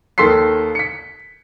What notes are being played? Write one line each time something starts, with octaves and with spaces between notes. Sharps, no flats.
D#2 D#3 A4 C6 B6 C7
B6 C#7